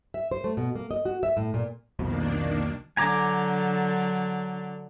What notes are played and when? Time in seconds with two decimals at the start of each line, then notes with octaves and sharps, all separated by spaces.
0.14 E5
0.31 C5
0.44 A3
0.57 B2
0.75 A#3
0.91 D#5
1.05 F#4
1.23 E5
1.37 A2
1.54 A#2
1.99 C2 F2 B2 D#3 A#3 D4
2.97 D3 F#3 G#5 A#5 D6